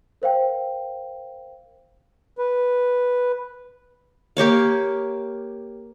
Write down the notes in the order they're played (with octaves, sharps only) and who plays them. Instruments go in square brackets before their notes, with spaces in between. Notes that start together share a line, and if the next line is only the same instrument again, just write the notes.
[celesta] A#4 C5 F5 G5
[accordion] B4
[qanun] A#3 G4 C#5 F5